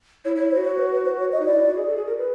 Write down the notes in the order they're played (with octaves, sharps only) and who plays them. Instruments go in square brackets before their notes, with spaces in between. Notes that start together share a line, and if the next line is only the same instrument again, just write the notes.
[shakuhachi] E4 [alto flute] C#5
[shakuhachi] E4 [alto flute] C#5
[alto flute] C5
[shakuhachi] F#4
[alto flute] C#5
B4
B4
C5
C#5
D#5
[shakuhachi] D#4
[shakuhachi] E4 [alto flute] D5
[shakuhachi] E4
F#4
G#4
A4
G#4
A#4
B4